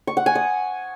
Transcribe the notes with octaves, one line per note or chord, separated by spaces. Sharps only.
C#6
F#5
G#5
D#6